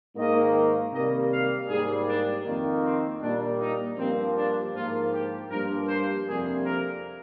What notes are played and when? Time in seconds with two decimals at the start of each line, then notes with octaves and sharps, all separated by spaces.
0.16 G#2 D#3 A#3 D#5
0.92 C3 D#3 G3 A#3 D#5
1.31 F5
1.68 G#2 G3 A#3 G#4
2.07 D4
2.45 F2 D#3 A#3
2.83 C4
3.21 A#2 G3 A#3 D4
3.60 D#4
3.97 G2 F3 A#3 C4
4.35 D4
4.73 G#2 F3 A#3 F4
5.12 G4
5.49 G2 F3 A#3 A#4
5.88 C5
6.26 F2 C3 G3 A#3 G#4
6.64 A#4